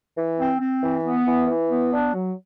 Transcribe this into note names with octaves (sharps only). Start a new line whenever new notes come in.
E3
C4
C4
E3
B3
E3
E3
B3
D4
F#3